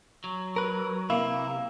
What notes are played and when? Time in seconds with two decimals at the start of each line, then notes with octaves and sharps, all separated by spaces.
0.24 F#3
0.56 A#4 B4
1.10 C3 A#3 E4